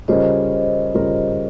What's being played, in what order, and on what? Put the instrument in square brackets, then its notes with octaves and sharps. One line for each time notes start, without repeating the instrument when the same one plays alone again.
[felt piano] C#3 G3 C#4 F4 A#4 [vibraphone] C5 D#5
[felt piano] C#3 G3 C#4 F4 A#4